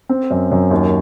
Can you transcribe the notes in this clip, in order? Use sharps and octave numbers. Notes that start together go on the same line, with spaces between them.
C4
F#2
F#2
D#2